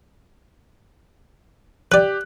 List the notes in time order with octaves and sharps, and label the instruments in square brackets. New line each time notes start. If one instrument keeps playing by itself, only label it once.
[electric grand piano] G4 F#6 [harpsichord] B4 D5